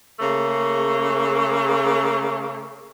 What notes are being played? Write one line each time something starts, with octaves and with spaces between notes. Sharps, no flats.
C#3 A3 A#3 G#4